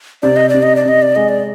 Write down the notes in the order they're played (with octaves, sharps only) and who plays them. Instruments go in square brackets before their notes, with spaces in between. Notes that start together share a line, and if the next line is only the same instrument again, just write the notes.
[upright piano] C3 [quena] D5
[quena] D#5
D5
[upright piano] C3
[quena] D#5
D5
[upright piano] C3 [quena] D#5
[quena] D5
[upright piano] G#3 [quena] D#5
[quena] D5